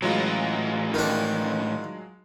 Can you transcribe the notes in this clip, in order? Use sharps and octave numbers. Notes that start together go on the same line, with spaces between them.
A2 E3 F#3 G#3 F4
D#3 D4